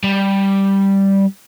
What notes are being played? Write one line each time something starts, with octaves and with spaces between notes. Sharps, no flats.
G3